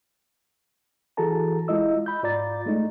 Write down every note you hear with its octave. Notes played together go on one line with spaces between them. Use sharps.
E3 F#4 G#4 A4 A5 A#5
G#3 E4 F4 D#5 E6
B5 G6
G#2 F4 D5 A#5 A6
G#3 A3 D#4